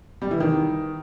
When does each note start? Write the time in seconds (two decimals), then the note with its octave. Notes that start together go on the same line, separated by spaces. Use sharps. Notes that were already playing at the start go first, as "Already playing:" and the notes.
0.22 G3
0.31 E3
0.40 D#3